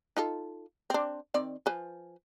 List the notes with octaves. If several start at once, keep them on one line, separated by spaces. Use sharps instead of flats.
D#4 F4 A4
C4 D4
D#3 C4 D5
F3 B4 G#5